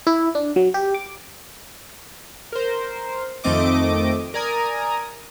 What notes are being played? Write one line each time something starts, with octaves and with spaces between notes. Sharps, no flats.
E4
D4
F#3
G4
D6
A#4 C5
F2 D#3 A3 C4 D#5 D6
A#4 D5 G#5 A#5 D#6